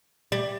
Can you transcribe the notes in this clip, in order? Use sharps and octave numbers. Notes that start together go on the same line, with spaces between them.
G3